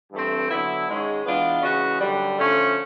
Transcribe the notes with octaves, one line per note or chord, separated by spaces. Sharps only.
G2 E3 A3 C4
D3 F#3 B3 E4
G#2 D#3 G#3 C#4
E3 G#3 B3 D4 F4
C#3 E3 G#3 C#4 F#4
F#2 D3 G3
D3 F3 A3 C#4